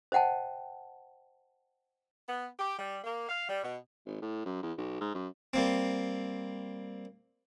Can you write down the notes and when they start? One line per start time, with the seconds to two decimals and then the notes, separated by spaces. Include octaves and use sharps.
0.12 C5 D#5 F#5 G5 A5
2.27 B3
2.59 G4
2.78 G3
3.04 A#3
3.28 F5
3.49 G3
3.63 B2
4.06 G#1
4.22 A2
4.46 F#2
4.63 E2
4.78 B1
5.01 G#2
5.15 F#2
5.54 G3 A#3 C4